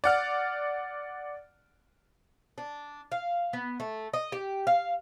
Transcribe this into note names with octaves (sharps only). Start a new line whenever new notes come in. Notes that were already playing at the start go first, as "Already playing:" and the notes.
D5 F#5 F6
D4
F5
B3
A3
D#5
G4
F5